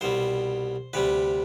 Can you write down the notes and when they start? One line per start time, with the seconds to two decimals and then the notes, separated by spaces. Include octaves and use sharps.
0.01 C2 B2 G3 C5
0.93 D2 C3 G3 B4